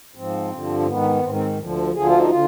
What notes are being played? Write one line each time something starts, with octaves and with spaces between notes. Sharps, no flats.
G#2 F3 C4
G2 D3 F3
C4
G#2 D#3 B3
G#2 D#3 C4
C4
D2 D3 F3
D2 D3 F3 G#4
F4
D#4
D3 F4